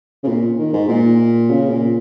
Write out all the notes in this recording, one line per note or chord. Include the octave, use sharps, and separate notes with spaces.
C#3
A#2
D#3
G#2
A#2
C#3
A#2